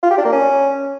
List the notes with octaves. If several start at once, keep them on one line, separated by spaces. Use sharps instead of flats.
F4
G4
D4
A#3
C#4